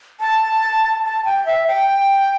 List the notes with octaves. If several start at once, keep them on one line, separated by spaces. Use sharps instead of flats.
A5
A5
G5
E5
G5